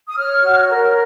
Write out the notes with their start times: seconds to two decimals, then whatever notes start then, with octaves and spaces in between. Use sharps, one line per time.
0.08 D#6
0.18 C#5 F6
0.43 F#4
0.69 A#4